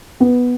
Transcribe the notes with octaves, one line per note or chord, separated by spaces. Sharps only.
B3